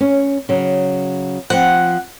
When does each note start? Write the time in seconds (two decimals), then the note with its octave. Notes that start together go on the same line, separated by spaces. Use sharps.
0.01 C#4
0.49 C#3 F#3
1.50 F3 C4 F#5